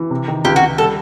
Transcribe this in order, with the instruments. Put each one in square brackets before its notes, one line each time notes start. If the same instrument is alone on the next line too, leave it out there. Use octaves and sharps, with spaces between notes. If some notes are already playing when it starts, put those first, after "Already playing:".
Already playing: [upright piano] E3
C3
D#3
[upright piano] C#2 [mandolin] G4
[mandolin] F#4
[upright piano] C#2
[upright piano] G3 [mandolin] A4